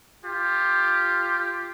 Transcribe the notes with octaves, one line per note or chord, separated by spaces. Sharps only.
F4 G4